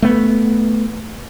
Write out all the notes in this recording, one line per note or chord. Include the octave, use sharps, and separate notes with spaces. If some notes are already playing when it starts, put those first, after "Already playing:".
A3 B3